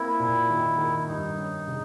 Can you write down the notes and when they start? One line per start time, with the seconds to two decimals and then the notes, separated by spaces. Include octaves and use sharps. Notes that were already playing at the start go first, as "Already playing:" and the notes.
Already playing: A#3 C4 E4
0.20 A#2
0.50 D#3
0.78 D#3
1.08 G2 D#4
1.38 C#4
1.68 C#3